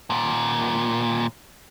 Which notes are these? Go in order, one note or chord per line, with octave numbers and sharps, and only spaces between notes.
D#2 A#2